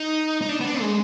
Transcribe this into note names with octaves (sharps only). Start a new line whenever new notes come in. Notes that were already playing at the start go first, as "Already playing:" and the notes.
Already playing: D#4
D#4
D4
B3
D4
G#3